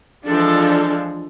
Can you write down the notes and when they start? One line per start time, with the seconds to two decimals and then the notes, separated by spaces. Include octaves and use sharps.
0.25 E3 F3 G#3 D4 F4 A4